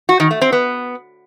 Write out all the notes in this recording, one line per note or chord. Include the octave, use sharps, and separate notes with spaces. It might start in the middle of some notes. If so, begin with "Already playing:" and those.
F#4
D#3
A3
C4
B3